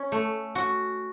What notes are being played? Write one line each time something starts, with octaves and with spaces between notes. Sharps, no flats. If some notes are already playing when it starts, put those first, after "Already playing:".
Already playing: C#4
A3
F#4